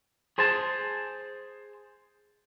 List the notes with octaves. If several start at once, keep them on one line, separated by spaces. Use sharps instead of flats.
G#4 C5 G#5 A5